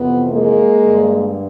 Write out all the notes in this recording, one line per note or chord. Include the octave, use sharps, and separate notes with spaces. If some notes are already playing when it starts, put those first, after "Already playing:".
Already playing: F2 C3 E3 B3
G#3 A#3
G2 D3